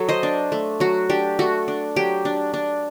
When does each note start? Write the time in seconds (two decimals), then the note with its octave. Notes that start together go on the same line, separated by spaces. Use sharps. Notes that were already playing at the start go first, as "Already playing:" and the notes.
Already playing: F#3 A4
0.09 C5 D#5
0.23 D4
0.52 A3
0.80 F#3 F#4
1.09 D4 G4
1.39 A3 F#4
1.68 D4
1.96 F#3 G4
2.25 D4
2.54 D4